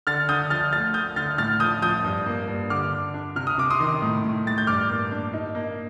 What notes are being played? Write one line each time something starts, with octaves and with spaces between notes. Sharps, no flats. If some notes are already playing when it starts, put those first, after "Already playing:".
D3 F6 A6
D3 D#6 G6
F3 F6 A6
A3 F6 A6
A3 D#6 G6
D3 F6 A6
A2 F6 A6
F3 D#6 G6
F3 D#6 G6
G2
A#3
G2
D3 D6 F6
D4
D4
C3 F6
D#6
C3 D6
C6 D#6
D#3
A2
A2
A2 A6
G6
G2 D6 F6
A#3
D4
D#4
A#3